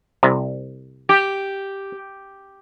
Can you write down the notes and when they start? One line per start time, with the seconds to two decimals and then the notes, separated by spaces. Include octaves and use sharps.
0.23 C2 C3
1.09 G4